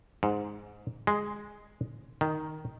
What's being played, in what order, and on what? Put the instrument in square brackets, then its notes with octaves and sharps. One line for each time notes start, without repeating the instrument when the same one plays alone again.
[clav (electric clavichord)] G#2
G#3
D#3